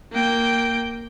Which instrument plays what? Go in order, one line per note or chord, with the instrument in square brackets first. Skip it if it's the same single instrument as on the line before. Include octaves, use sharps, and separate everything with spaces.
[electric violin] A#3 G5